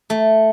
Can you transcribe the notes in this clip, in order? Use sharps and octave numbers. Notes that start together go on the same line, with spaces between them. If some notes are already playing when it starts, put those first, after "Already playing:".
A3